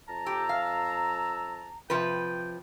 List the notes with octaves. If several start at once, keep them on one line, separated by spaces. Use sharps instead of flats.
F2 A5 A#5
G4 E6
F5
C3 F3 B4 G5